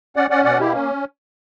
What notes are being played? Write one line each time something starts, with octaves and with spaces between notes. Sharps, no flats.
C#4 D5 F#5
C#4 D5 F#5
B2 D5 F#5
A#3 E4 G4
C#4